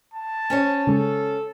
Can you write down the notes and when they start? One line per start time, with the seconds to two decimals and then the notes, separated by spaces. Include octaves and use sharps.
0.14 A5
0.50 C#4 C5 C#5
0.87 C#3 G#3 A4